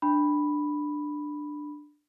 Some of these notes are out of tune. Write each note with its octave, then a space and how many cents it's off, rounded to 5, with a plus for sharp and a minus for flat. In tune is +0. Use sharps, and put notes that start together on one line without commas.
D4 +10 B5 +0